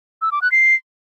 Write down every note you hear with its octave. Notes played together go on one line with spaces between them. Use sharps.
E6
D6
F#6
C7